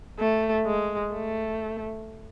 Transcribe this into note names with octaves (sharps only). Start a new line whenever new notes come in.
A3
G#3
A3